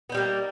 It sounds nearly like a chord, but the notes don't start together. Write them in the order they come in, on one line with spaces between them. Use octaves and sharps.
B3 D#4 G3 A#3